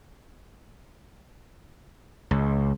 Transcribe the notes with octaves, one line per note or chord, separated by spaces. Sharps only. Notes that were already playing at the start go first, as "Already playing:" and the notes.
C#2